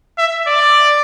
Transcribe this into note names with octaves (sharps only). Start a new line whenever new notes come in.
E5
D5